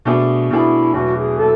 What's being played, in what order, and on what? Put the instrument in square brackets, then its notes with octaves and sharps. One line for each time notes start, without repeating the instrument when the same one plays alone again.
[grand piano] B2 A3 D4 G#4
[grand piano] B2 A3 D4 G#4 [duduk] E4
[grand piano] E2 B2 F#3 A3 [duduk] F#4
[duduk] G#4
[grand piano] B2 F#3 A3 [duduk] A4